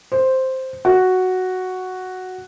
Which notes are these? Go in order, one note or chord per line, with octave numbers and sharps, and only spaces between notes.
C5
F#4